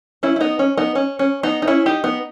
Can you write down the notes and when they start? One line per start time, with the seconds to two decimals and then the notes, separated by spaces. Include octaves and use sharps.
0.23 C#4 E4
0.36 E4
0.41 B3 D#4
0.59 C#4
0.78 B3 D#4
0.95 C#4
1.19 C#4
1.43 B3 D#4
1.62 D#4
1.68 C#4 E4
1.86 D#4 G4
2.04 B3 D#4